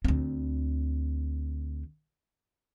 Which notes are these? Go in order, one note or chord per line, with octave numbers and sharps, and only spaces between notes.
D2 C4